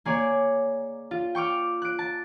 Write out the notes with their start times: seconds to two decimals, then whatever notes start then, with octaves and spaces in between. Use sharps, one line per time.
0.05 A#3 G#4 C#5 D5
1.11 F4
1.35 G5 C#6 D6 F6
1.82 F#6 D7
1.99 A5